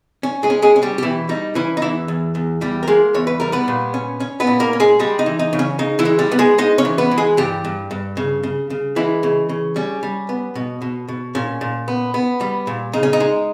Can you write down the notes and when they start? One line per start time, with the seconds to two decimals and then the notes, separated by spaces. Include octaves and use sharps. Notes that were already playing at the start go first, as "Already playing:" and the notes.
0.23 C#4
0.43 G#3 G#4
0.50 C#4
0.62 G#3 G#4
0.76 C#4
0.83 G3 G4
0.98 G4
1.02 B2 E3 E4
1.29 G3 D#4
1.55 E3 C#4 E4
1.77 D#4
1.82 E2 E3 E4
2.08 E2
2.35 E2
2.61 E2 G3 G4
2.83 A#4
2.88 G#3 A#3 G#4
3.14 E2 C#5
3.27 B4
3.40 G3 A#4
3.52 B3 B4
3.68 A#2
3.94 C#4
4.20 C#4
4.40 B3 B4
4.47 A#2
4.60 A#3 A#4
4.73 C#4
4.80 G#3 G#4
4.99 G3 G#3 G4
5.19 D#4
5.26 E3
5.39 D#4
5.53 C#3
5.59 C#4
5.79 C#3 D#4
5.99 E3 E4
6.05 G#3
6.19 G3 G4
6.32 B3
6.39 G#3 G#4
6.58 G#3 D#4 D#5
6.78 C#4 C#5
6.85 E3
6.98 B3 B4
7.11 E3
7.18 G#3 G#4
7.37 G2 G3 G4
7.64 G2
7.91 G2
8.17 C#3
8.43 C#3
8.70 C#3
8.96 E3 G#3 E4
9.23 C#3
9.49 C#3
9.76 G3 C#4
10.03 G3
10.29 B3
10.55 B2
10.82 B2
11.08 B2
11.35 A#2 C#4
11.61 A#2
11.88 B3
12.14 B3
12.41 G3
12.67 A#2
12.93 C#3 D#4
13.03 C#4
13.13 D#4
13.20 G#3